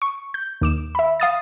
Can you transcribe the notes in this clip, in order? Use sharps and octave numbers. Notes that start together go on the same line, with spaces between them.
C#6
G6
D#2 D6 E7
E5 B5
F5 D#6 A6